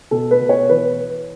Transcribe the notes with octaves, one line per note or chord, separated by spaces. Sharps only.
B2 A4
B4
B2
C#5
E3 B4